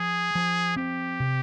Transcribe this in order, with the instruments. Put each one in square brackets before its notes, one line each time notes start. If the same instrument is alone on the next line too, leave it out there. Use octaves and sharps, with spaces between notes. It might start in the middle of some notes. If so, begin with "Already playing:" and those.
Already playing: [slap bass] F3 [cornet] G#4
[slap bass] F3
[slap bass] C4 [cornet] G4
[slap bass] C3